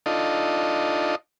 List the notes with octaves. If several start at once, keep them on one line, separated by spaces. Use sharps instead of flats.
D4 D#4 F4 A4 D#5